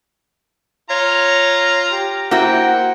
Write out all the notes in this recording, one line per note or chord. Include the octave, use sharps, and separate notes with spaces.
F4 C#5 A#5
G4
A#3 E4 F#4 C5 F#5 G5